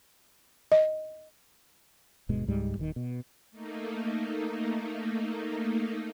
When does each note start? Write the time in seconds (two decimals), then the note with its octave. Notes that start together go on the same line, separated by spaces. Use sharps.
0.72 D#5
2.29 D1 G2 B2 G#3
2.47 C#2 G#2 G3 G#3
2.77 D#1 G#2 D#3
2.96 B2
3.51 A3 A#3 D#4